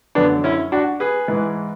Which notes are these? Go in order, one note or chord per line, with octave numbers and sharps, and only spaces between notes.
F#2 D3 B3 D4
C#4 E4
D4 F#4
G#4 B4
G#2 E3